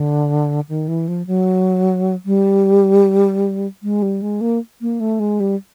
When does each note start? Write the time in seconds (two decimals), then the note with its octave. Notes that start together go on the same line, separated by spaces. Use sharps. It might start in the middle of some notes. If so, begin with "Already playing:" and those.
Already playing: D3
0.69 D#3
0.88 E3
1.08 F3
1.27 F#3
2.26 G3
3.83 G#3
4.02 G3
4.22 G#3
4.41 A#3
4.81 A#3
5.00 A3
5.20 G#3
5.40 G3